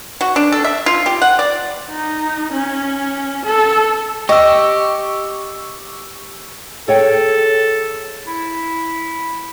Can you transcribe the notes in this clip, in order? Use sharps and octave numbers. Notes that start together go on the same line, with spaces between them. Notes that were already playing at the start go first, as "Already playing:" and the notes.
F#4
D4
A4
E5
F4
G4
F#5
D5
D#4
C#4
A4
G4 D#5 C#6 E6
G#4 A4 C#5 G5
E4